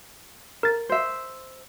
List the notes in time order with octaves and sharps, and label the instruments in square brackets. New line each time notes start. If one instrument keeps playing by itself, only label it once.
[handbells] A#4 A6
[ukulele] C5 E5